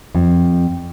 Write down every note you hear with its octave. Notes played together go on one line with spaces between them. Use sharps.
F2